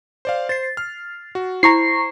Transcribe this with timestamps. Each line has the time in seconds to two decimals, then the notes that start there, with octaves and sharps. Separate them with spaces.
0.25 C5 D5 F5
0.49 C5 A6 C7
0.77 F6
1.35 F#4
1.63 E4 C5 A#5 C#6 C7